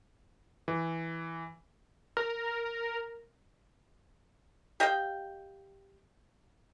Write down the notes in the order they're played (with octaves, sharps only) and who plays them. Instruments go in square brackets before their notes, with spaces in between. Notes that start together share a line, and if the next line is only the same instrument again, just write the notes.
[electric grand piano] E3
[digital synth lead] A#4
[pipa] G4 D#5 F5 G5